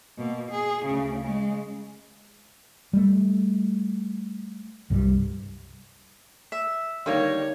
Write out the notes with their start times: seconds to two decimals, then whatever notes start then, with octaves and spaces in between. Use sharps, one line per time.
0.18 B2 A#3
0.51 G#4
0.85 D2 C#3
1.23 C#3 G#3
2.93 G3 A3
4.90 C2 G2 F3 G3
6.52 E5
7.06 D3 D#3 G3 A#3 C#5